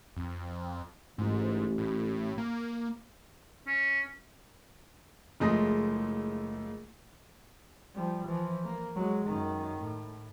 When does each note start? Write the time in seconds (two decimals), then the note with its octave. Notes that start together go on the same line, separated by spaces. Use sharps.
0.17 F2
1.18 A1 G#2
1.78 A2
2.38 A#3
3.67 C#4
5.40 F#1 F3 G#3 A3 D#6 A#6
7.95 F3 G3
8.27 E3 F3
8.65 A#3
8.96 F#3 G#3
9.26 F#2 D#3
9.82 A2